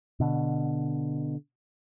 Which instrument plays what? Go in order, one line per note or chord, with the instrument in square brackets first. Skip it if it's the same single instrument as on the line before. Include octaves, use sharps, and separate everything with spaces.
[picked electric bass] B2 D3